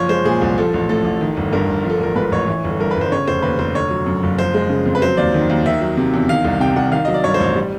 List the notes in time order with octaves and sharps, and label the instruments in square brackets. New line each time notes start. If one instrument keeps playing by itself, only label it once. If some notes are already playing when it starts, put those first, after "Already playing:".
Already playing: [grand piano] F#1 F3 C#5
G#3 C5
A#2 G#4
C2
F3 A4
A1
A2 A4
A1
D#3
G1
G2 A#4
G1
F3
A4
A1 A#4
G#2 B4
A1 C#5
E3
G1
A4
G2 A#4
G1 B4
C5
C#3 C#5
F1 C5
D#2 B4
F1 C5
D3 C#5
F#3
F#2
F#1
F3 C5
G#3
C#3
F2
B4
F#3 C5
D#2 D5
D#3
D#2
D#3 E5
F#3
C3
E2
D#3 F5
C2
C3 G5
C2 F#5
D#3 F5
F#3 D#5
D5
G2 C#5
C5
A1 C#5
G3